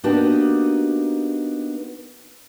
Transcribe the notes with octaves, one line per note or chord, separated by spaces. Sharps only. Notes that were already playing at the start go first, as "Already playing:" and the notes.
A#3 B3 D4 D#4 F#4 G4